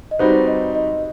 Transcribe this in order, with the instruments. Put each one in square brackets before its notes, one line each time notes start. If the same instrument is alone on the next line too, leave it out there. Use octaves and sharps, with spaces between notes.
[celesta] D#5
[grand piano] G3 C4 D#4 F#4 B4 [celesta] C5
[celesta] D#5
D#5